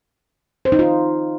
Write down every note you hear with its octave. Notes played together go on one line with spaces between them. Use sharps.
C5
D#4
F4